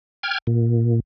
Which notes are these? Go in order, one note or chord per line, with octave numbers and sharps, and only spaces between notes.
G5 F6 G#6
A#2